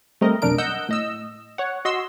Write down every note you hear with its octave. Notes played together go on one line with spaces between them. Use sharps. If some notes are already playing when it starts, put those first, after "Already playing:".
G3 A3 C4 A#4 D#5
B1 F2 D4 A#4 D7
D#5 F#5 E6 G6
A2 D#5 E6
C#5 F#5
F#4 D#5 C6 E6